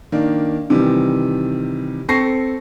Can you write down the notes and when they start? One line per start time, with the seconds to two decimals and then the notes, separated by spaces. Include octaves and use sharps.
0.12 D#3 A#3 D4
0.70 C3 D#3 E3 G3
2.09 C4 A4 C#6 A#6 C7